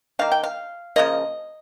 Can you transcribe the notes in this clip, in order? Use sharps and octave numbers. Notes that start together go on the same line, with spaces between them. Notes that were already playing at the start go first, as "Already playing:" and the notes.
D#3 A#3 F5
G5
F5
C#3 F3 A#3 D#5